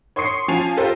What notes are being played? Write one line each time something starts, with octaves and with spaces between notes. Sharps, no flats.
C#5 C6 C#6 D#6 C7 C#7
F3 C#4 G#5 A5 C7 F7
F4 G4 A4 A#4 C5